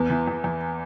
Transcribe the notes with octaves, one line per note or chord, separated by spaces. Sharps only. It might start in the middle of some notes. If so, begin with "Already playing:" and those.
Already playing: E2 B3
E3
E2
E2